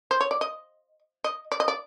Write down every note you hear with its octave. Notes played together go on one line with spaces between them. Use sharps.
C5
C#5
D5
D#5
D#5
D5
D#5
D5